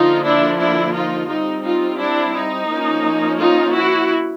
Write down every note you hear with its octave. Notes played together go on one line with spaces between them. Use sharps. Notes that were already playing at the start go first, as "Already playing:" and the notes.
Already playing: D3 F3 A#3 D#4 F4
D4 E4
D4 E4
D#4 F4
G3 C4 D#4
D#4 F4
D4 E4
D#4
F3 A#3 C#4
D#4 F4
E4 F#4